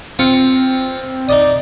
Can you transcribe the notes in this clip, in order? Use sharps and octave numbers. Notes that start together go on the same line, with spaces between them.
C4 F4 C#7
D#4 D5 D#5 D#6